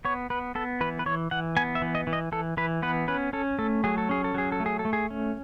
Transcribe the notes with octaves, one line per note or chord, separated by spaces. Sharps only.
B3 C#5
B3 B4
B3 A4
E3 B4
B4
E3 C#5
E3 F#5
B3 G#5
E5
E3
D#5
E3
D#5
E3 A4
E3 B4
B3 B4
C#4 B4
C#4 A4
A3 A4
F#3 G#4
A4
C#4 G#4
A4
F#3 G#4
A4
A3
G#4
A4
A3
G#4
C#4